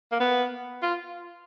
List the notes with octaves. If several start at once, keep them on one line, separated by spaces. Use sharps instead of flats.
A#3
B3
F4